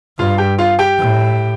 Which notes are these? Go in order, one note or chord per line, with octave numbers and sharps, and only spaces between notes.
G2 F4 F5
G4 G5
F4 F5
G4 G5
A2